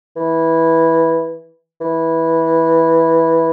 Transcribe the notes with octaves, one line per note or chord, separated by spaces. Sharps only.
E3
E3